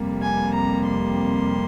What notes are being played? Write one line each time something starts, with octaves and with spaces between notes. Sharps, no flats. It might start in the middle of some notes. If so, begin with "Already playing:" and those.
Already playing: F2 C3 G3 A#3
G#5
A#5
C6